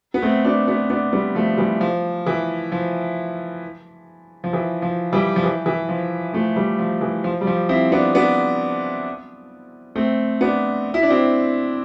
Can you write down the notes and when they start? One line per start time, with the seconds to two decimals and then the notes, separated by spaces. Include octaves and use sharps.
0.14 B3
0.22 A3 C4
0.44 B3 D4
0.67 B3 D4
0.90 B3 D4
1.13 G3 B3
1.35 F3 A3
1.58 E3 G3
1.81 F3
2.26 E3
2.72 F3
4.44 F3
4.53 E3
4.82 F3
5.13 E3 G3
5.36 F3
5.44 E3
5.66 E3
5.89 F3
6.33 F3 A3
6.56 E3 G3
6.79 F3
7.01 E3
7.24 F3
7.41 G3
7.47 F3
7.69 C4 E4
7.92 B3 D4
8.15 B3 D4
9.95 A3 C4
10.41 B3 D4
10.94 E4
11.03 D4
11.10 C4 E4